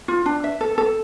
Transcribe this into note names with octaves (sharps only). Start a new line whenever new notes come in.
F4
D4
E5
A4
A4